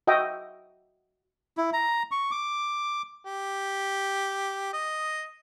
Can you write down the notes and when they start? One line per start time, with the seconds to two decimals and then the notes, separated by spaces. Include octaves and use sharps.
0.07 F#4 D#5 E5 G5
1.57 E4
1.73 A#5
2.11 C#6
2.31 D6
3.25 G4
4.73 D#5